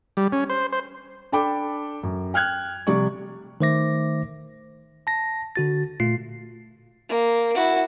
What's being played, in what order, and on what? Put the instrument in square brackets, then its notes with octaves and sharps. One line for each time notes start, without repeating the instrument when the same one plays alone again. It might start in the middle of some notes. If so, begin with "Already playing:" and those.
[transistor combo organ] G3
C#4
C5
C5
[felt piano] D4 A4 G5 B5 D6
F#2
G5 F6 F#6 G#6
C3 F3 G3 D5 C#6
[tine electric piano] D#3 A3 C5 E5 D6 A#6
A5 A#6
D3 F#4 A6
A#2 A3 F4 C7
[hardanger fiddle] A#3
E4 F#4